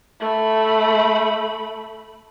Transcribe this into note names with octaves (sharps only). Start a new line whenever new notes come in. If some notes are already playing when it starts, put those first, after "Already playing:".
A3 B5